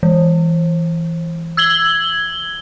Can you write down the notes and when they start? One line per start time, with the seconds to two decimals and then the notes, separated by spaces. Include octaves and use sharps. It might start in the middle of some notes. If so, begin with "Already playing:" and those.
0.03 E3
1.57 E6 G#6 F#7 G7